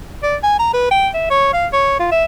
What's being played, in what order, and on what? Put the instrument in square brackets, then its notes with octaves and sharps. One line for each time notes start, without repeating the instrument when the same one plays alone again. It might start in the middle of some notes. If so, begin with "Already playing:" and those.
[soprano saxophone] D5
G#5
A#5
B4
G5
E5
C#5
F5
C#5
F4
E5